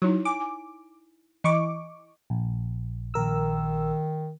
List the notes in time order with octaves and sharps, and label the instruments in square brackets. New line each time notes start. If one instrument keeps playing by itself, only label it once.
[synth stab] F#3 [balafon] D#4 E4 C#5
[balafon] G#5 [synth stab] D6
[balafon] G#5
[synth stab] E3 C#6 D6 [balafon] D#5
[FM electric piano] A#1
[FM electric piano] A#1 A#4 E6 [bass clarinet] D#3